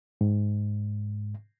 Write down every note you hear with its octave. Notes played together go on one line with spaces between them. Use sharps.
G#2